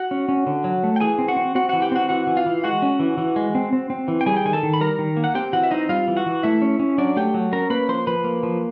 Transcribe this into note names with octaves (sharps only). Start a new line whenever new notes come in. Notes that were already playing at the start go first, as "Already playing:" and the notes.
Already playing: F#4 F#5
C#4
C#4
D3
F#3
A3
G5
E3 G#4 G#5
C4
F#4 F#5
C4
C4 F#4 F#5
E3 F#4 F#5
G4 G5
C4 F#4 F#5
E3 F#4 F#5
E3
F4 F5
E3
G#3 F#4 F#5
C#4
E3
E3
G#3
C4
C4
C4
E3
G5
G3 G#4 G#5
G5
D#3 G#5
A4 A5
D#3
B5
G3 A#4 A#5
D#3
A#3
F#5
C4 G4 G5
E3 F#4 F#5
E5
C4 D#4 D#5
G3 F4 F5
E3
F#4 F#5
E3
A3 E4 E5
C#4
C#4
F#3 D4 D5
A3 G4 G5
F#3
C#4 A#4 A#5
A#3 B4 B5
F3 C5 C6
F3 B4 B5
A#3
F3